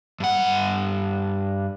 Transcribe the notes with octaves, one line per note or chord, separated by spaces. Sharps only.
G2 F#5